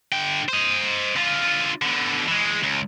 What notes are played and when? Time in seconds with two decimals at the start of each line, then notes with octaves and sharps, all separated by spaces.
0.12 D3 G5
0.49 C5 D#5
1.16 D3 F4
1.82 B2 D3
2.28 E3 G#3
2.63 C#2